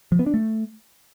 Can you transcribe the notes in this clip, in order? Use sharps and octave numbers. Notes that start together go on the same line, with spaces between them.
F3
B3
D4
A3